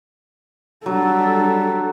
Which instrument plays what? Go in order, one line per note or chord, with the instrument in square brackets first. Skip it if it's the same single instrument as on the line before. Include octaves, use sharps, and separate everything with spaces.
[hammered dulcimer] F#3 [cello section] G3 [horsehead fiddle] D4 A4